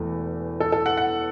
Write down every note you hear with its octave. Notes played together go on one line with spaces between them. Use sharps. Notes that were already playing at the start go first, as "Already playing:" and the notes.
Already playing: E1 E2 E3 A3
A4
A4
F#5
F#5